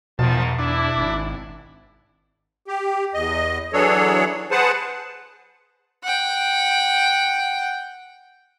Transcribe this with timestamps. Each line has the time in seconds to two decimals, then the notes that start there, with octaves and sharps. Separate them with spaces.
0.19 E2 G#2 B2 D#3 F3 A5
0.59 E2 D4 E4
0.97 G#1
2.68 G4
3.14 E2 D#5
3.73 E3 F#3 D4 G#4 A4 C#5
4.51 G#4 B4 C5 F#5 A5
6.03 F#5 G5